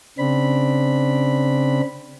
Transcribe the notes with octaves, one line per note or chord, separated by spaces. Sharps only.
C#3 C4 D4 B5